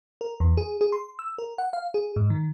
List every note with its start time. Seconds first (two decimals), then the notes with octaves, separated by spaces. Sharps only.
0.21 A#4
0.40 E2
0.57 G#4
0.81 G#4
0.92 C6
1.19 E6
1.38 A#4
1.58 F#5
1.73 F5
1.94 G#4
2.16 G#2
2.30 D#3